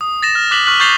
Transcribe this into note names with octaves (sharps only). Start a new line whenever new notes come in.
D#6
A6 A#6 E7
F6
D6 F#6 B6 F#7
C#6 F6 F#6 B6 F#7
C#6 G6 A6 C7 F7 G7